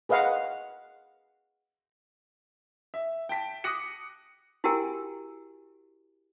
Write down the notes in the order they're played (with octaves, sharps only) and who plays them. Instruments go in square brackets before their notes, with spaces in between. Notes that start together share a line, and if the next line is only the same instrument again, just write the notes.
[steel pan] G#4 B4 D#5 F5 F#5
[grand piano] E5
G5 A5 B6
D6 D#6 F#6 A#6 C#7
[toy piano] E4 F#4 G4 A#4 G5 G#5